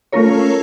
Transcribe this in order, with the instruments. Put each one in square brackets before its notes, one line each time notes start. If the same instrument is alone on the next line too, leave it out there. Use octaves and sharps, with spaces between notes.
[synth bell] A3 C#4 F4 A#4 C#5